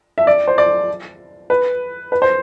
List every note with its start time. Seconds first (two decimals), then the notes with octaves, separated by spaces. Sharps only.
0.18 E5
0.27 D5
0.48 C5
0.58 D5
1.50 B4
2.12 B4
2.22 C5